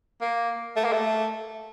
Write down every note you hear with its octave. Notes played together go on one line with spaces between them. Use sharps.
A#3
A3
A#3
A3